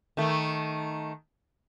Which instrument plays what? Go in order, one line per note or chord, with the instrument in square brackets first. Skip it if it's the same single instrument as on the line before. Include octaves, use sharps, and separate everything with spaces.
[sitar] D#3 A3